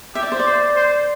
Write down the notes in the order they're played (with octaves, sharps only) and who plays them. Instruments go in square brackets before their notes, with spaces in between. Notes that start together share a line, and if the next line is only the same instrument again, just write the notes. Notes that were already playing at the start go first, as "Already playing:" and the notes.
[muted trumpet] G4 [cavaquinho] E5
[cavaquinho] D5
C5
D5
[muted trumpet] C5
C5